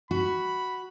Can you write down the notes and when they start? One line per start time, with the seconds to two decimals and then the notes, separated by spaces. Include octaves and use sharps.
0.11 F#4 B5